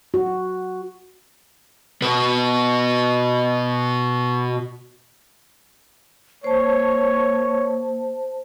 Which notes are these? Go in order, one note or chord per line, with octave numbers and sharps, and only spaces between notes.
F#4
B2 B3
A#3 C5 C#5 A5